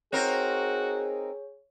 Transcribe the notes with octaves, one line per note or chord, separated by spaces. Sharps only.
C4 D#4 F#4 G#4 A#4 C#5